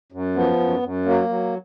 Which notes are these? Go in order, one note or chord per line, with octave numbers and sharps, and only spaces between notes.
F#2
F3 B3
F#2
F#2
F#3 A#3
F#3